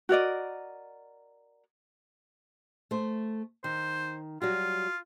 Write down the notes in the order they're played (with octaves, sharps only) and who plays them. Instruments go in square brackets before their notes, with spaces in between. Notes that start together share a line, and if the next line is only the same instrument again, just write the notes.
[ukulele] F#4 A#4 D5 D#5
[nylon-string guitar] A3 C5
[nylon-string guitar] D#3 [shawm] C5
[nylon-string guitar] F#3 G3 F#4 [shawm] F4